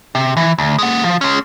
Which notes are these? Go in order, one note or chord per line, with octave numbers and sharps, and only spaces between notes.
C3
E3
D2
G#3 F#5
F3
G#3 C#4